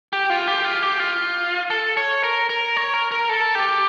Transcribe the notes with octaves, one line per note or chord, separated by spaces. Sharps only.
G4
F4
G4
F4
G4
F4
A4
C#5
A#4
A#4
C#5
A#4
A#4
A4
G4